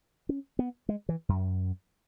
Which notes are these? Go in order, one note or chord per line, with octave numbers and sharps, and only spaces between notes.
C#4
B3
G#3
E3
F#2